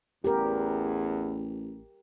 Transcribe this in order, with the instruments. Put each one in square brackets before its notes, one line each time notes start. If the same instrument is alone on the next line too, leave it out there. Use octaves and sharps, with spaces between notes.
[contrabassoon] A1 [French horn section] E2 [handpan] G4 A#4